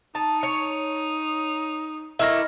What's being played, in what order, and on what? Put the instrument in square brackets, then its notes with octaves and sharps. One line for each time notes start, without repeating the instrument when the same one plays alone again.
[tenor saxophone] D#4 [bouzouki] A5
[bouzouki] C#5
[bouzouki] A3 A#3 E4 [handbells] D#5 F6 A#6